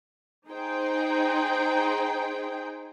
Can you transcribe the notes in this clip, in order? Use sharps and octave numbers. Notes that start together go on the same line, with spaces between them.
D#4 G#4 C5 G5